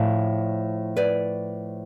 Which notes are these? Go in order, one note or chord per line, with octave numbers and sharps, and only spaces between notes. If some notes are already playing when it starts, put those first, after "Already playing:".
Already playing: A2 F3 D5 F5
B4 D5